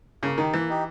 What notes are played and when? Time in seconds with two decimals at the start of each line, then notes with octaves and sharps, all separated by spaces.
0.23 C#3 A#3
0.38 D#3 D#4 G4
0.54 E3 A#3
0.69 D#4 G4